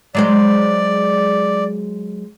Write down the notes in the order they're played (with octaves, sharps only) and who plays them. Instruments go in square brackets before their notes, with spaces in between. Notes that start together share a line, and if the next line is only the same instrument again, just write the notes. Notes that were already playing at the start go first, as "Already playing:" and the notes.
[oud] F#3 G#3 C5 [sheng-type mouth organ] D5